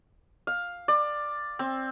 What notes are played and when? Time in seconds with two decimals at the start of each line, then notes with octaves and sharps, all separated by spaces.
0.47 F5
0.88 D5
1.59 C4